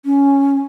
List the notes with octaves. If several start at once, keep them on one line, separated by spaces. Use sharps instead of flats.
C#4